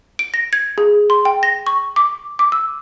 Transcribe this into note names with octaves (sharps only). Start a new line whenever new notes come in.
D7
A#6
G#6
G#4
C6
G5
A#6
C#6
D6
D6
E6